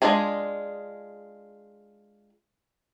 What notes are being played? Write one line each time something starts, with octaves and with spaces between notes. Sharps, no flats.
G#3 A3 D4 F4 G#4